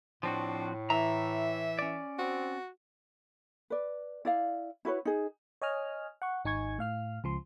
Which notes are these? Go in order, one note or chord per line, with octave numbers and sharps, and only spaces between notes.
A2 F3 C4 D4 F#4
E3 E5 A#5
C#4 D5
C4 F#4
B4 D5
E4 D5 F5
E4 F#4 B4 C#5
D#4 G#4
C#5 D#5 G#5 F6
F#5 C#6
G#1 D#4 G#5 C#6 G#6
A2 F5 F6
C#2 F3 C6